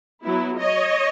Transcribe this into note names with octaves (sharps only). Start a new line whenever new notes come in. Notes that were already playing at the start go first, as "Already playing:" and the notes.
F#3 B3 E4
C#5 D#5